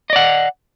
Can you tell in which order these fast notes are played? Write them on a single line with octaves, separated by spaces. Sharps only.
D#5 D5 F#5